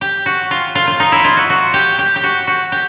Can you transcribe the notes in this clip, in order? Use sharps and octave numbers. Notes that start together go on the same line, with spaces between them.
G4
F#4
F4
F4
F4
D#4
E4
F4
F#4
F#4
G4
G4
G4
F#4
F#4
G4